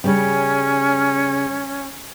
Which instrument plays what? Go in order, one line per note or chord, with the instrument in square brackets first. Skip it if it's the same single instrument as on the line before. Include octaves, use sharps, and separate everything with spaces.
[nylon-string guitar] C#3 G3 [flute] C#4